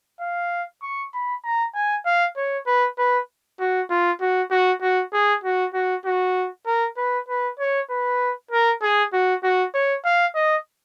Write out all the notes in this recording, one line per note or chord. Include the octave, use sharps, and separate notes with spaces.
F5
C#6
B5
A#5
G#5
F5
C#5
B4
B4
F#4
F4
F#4
F#4
F#4
G#4
F#4
F#4
F#4
A#4
B4
B4
C#5
B4
A#4
G#4
F#4
F#4
C#5
F5
D#5